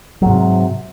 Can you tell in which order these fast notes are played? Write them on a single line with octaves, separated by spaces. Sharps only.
F#3 G#2 C3